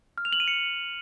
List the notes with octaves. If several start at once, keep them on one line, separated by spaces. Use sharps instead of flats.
F6
F7
F#7
D#7
C#7